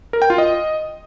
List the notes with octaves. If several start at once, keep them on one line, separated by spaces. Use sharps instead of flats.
A#4
G5
F4
D#5